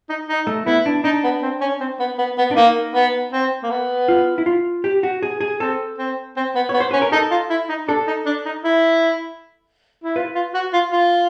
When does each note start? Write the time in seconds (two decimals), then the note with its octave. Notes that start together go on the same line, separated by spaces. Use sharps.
0.09 D#4
0.28 D#4
0.47 A3
0.66 B3 E4
0.86 D4
1.04 D4 D#4
1.24 B3
1.42 C4
1.61 C#4
1.80 C4
1.99 B3
2.18 B3
2.38 B3
2.51 D4
2.56 A#3 D#4
2.95 B3
3.32 C4
3.63 A#3
3.70 B3
4.08 F4
4.38 E4
4.46 F4
4.84 G4
5.03 F#4
5.23 G#4
5.41 G#4
5.60 C4 A4
5.98 C4
6.36 C4
6.55 B3
6.69 B3 C#5
6.80 C5
6.91 C#4 B4
7.02 A#4
7.12 D#4 A4
7.31 F4
7.50 E4
7.69 D#4
7.87 D4 A4
8.07 D#4
8.26 D4
8.45 D#4
8.64 E4
10.04 E4
10.16 F4 B4
10.35 F4
10.54 F#4
10.73 F4
10.92 F4